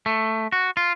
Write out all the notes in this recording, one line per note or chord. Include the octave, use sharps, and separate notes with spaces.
A3
F#4
F4